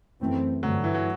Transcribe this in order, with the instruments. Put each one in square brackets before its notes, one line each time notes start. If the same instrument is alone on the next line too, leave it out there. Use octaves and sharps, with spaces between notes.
[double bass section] F#2 E3 A3 C4
[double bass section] G2 D3 A3 [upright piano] F#3
[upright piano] E3
F#3